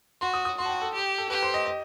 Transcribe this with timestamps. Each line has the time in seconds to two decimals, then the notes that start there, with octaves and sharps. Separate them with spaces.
0.21 F#4 C6
0.34 D#6
0.45 D#6
0.58 F#4 C6
0.65 A5
0.70 G5
0.81 A4
0.94 G4
1.18 A4
1.30 G4 B4
1.43 C5
1.54 D#5
1.66 D#5